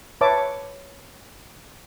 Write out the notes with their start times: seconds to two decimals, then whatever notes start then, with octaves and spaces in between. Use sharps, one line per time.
0.21 B4 C#5 E5 A5 D6